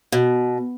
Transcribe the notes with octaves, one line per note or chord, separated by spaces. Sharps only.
B2